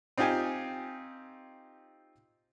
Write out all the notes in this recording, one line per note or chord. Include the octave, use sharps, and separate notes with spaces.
C4 D#4 F4 G4 G#5